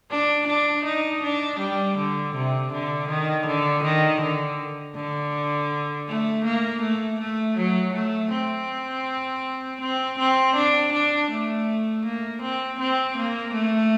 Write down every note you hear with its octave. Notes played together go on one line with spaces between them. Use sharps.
D4
D4
D#4
D4
G3
D3
C3
D3
D#3
D3
D#3
D3
D3
A3
A#3
A3
A3
F#3
A3
C4
C4
C4
D4
D4
A3
A#3
C4
C4
A#3
A3